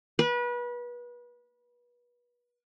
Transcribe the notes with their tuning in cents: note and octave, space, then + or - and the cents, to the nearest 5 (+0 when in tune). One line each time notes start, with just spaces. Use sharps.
B4 -30